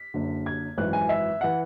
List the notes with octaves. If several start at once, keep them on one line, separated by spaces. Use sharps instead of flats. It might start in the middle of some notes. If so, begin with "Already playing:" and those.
Already playing: B6
F#1 F#2 D3
G#6
G#1 F#2 E3 F#6
G#5
E5
E3 F#5